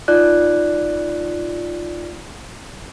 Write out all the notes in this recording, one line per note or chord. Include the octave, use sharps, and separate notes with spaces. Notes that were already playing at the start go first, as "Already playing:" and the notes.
D#4 F4 D5 F#6